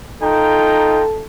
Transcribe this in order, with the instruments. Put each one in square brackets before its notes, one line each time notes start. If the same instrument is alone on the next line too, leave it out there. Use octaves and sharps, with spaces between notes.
[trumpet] D#4 [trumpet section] F4 G5 A#5 [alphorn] A4